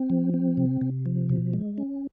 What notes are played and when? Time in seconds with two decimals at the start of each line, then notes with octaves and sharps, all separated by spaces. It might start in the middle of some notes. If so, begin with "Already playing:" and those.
Already playing: C4
0.10 F3
0.34 C4
0.57 C3
0.81 C3
1.06 F3
1.29 B2
1.53 G#3
1.78 C#4